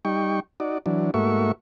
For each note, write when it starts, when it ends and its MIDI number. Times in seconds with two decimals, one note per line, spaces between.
0.05 0.40 55
0.05 0.40 63
0.05 0.40 79
0.05 0.40 85
0.60 0.78 63
0.60 0.78 66
0.60 0.78 74
0.86 1.11 52
0.86 1.11 54
0.86 1.11 62
1.14 1.52 44
1.14 1.52 57
1.14 1.52 58
1.14 1.52 66
1.14 1.52 76
1.14 1.52 85